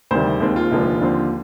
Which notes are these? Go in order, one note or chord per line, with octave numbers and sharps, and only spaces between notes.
D2 C3 D#3 G3 C5
D#2 D#3 G#3 C4
F4
F1 D#2 D3 F3 G#3
D#2 D3 F3 C4